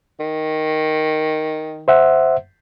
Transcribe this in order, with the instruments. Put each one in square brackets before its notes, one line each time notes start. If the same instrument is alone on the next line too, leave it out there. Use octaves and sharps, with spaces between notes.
[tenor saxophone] D#3
[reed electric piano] C5 E5 F#5